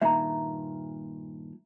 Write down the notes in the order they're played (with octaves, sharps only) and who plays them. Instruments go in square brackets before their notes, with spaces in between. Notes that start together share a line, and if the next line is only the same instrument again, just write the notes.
[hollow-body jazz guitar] G2 A#2 D#3 [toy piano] E5 A#5